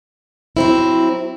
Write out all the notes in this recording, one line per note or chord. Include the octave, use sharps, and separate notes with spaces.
F#3 C4 E4